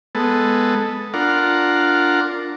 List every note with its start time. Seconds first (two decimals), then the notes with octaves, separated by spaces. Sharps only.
0.15 G#3 B3 A4
1.14 D4 F4 A#4 F#5